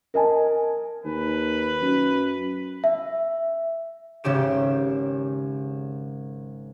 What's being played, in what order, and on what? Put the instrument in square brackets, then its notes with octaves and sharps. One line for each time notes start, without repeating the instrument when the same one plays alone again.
[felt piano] A#4 D#5 G#5 A5
[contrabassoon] D#2 [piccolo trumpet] B4
[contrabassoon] F#2
[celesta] E5
[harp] G#1 G#2 C#3 G4 E7